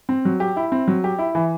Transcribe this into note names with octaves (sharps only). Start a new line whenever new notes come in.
C4
F#3
G4
E4
C4
F#3
G4
E4
E3